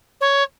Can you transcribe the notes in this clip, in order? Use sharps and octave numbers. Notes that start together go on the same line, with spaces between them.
C#5